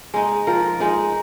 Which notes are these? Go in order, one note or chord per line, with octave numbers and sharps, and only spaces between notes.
G#3 D#4
F3 A#4
G#3 D#4